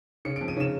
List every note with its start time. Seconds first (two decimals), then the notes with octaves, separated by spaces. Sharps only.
0.25 C#3 C#7
0.36 D7
0.41 F2
0.48 D#7
0.57 C#3 E7